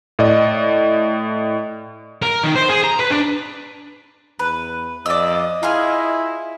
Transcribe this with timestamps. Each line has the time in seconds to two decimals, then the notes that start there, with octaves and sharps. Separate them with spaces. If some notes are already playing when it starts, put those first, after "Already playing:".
0.19 A2 D5 D#5
2.22 A#4
2.43 D#3
2.55 C5
2.69 G#4
2.84 A#5
2.99 B4
3.10 D4
4.39 E2 B4
5.06 F2 D5 D#5 E6
5.63 E4 F4 G#4 F6